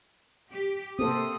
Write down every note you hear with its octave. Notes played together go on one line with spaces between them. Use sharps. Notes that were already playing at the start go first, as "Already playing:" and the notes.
G4
C3 A#3 C4 A4 C5 D#6